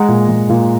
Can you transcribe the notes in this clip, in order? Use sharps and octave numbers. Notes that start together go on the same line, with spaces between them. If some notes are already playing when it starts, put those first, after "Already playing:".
Already playing: G#3 F#5 A#5
A#2
G#3
A#2